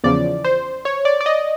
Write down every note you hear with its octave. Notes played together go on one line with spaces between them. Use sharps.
E2 C#3 F3 D5
C5
C#5
D5
D5
D#5